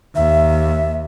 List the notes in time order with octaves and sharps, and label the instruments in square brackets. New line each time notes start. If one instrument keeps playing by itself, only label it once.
[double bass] D#2 [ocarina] E5